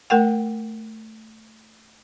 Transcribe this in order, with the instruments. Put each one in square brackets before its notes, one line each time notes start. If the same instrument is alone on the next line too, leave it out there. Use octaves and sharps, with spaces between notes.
[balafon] A3 A#4 F#5 G5